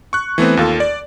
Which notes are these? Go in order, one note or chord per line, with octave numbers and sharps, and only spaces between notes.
C#6 F#6
E3 A3 B3 C4
D#2 F4 A4
D5